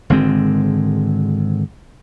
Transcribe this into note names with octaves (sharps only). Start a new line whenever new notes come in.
G#1 D3 G#3 C4